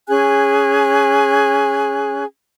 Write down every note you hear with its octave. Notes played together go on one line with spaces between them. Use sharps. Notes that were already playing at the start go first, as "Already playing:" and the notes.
C#4 G#4 G#5 F#6